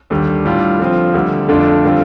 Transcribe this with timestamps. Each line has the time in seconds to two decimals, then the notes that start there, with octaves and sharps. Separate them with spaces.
0.10 D#2 D3 G3
0.45 A2 G3 D4 F4
0.79 D3 F3 C4 F4
1.14 D2 D3 G3
1.49 F2 D3 A3 D4 F4
1.85 D3 G3 C4 F4